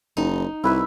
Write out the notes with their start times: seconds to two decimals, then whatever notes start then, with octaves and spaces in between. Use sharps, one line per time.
0.17 F#1 D#4
0.64 C2 E4 B4 E5